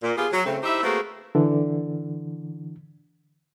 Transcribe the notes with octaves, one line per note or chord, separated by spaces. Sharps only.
A#2
B3 F4 G4 G#4
F#3
C#3 A3 C4
D#4 E4 G4 C5 E5
A3 A#3 C4 F#4 G#4 B4
D3 E3